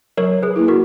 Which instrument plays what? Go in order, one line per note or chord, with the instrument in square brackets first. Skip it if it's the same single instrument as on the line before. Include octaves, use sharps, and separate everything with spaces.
[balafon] F#3 [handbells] A#4 C#5
[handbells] G#4 B4
[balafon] A#3 E4
[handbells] F#4 A#4